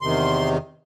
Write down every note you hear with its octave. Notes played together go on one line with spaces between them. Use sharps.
E2 C3 D#3 C6